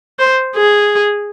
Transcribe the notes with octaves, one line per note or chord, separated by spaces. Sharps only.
C5
G#4